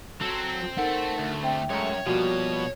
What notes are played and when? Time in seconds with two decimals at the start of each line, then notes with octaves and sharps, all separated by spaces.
0.21 F#3 C4 A4
0.77 A3 D#4 A#4 F#5
1.19 D2
1.43 C4 E5 G5
1.70 F#2 G#3 A3 A#4 C#5
2.06 B2 F3 G3 A#3 F#4